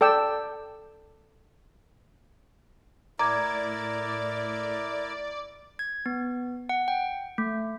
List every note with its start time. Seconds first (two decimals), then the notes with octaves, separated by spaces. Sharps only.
0.01 A4 D5 G5 E6
3.19 A2 E4 A#4 D5 A#5 D6 G#6
5.79 G#6
6.06 B3
6.69 F#5
6.88 G5
7.38 A3